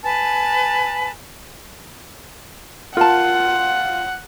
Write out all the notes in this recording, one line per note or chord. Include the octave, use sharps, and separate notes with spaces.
B4 G#5 A5
F4 A#4 F#5 A5